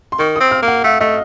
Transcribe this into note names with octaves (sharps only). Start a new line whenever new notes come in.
C6
D#3 C#6
D#6
C4
F6
A#3
F#5
A3 F5
A3 D#5